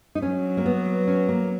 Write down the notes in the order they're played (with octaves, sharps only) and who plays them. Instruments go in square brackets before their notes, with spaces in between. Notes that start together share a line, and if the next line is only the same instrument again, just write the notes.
[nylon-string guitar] D#4
[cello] F#3 [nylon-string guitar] C#4
[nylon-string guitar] A#3
B3
C#4
A#3